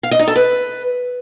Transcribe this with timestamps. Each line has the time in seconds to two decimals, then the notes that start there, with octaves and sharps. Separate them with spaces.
0.03 F5
0.11 D#5
0.19 D#4
0.28 A4
0.36 B4